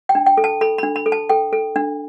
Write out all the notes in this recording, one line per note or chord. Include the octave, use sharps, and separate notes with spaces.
G5
D4
G5
A4
A5
A4 B5
B5
D4
B5
A4
A5
A4 G5
A4
D4